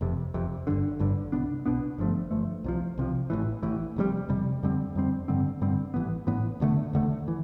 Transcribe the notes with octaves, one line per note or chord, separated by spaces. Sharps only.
F1 F2 C3
F1 F2 C3
G1 G2 D3
G1 G2 D3
C2 B2 B3 D4
C2 B2 B3 D4
G1 G2 F3 A3
G1 G2 F3 A3
C2 C3 F3
C2 C3 F3
A1 A2 E3
A1 A2 E3
F1 F2 C3 G3
F1 F2 C3 G3
F2 D3 G3 C4
F2 D3 G3 C4
G2 D3 G3 C4
G2 D3 G3 C4
A1 A2 E3 B3
A1 A2 E3 B3
E1 D2 D3 A3
E1 D2 D3 A3
E3